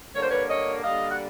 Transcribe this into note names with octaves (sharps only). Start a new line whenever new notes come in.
D3 G3 A#3 C#5
C5
B4 C#5
C#5 D#5
D3 G3 A#3 D#5 F5
F#5